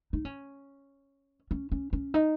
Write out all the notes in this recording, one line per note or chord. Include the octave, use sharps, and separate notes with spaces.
D#4
C#4
C#4
C#4
C#4
D#4